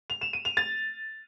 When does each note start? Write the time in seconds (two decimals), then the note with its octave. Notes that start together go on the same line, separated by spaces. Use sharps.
0.10 F7
0.21 E7
0.33 D#7
0.45 F7
0.57 A6